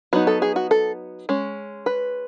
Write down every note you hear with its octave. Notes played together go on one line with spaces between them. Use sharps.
F#3 B3 D#4 F#4
A4
G#4
F#4
A4
G#3 C#4
B4